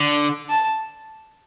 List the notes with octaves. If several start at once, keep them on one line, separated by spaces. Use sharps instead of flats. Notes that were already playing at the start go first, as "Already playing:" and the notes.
Already playing: D3
A5